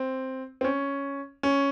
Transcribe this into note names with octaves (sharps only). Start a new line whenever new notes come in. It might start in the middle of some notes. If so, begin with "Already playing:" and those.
Already playing: C4
C4
C#4
C#4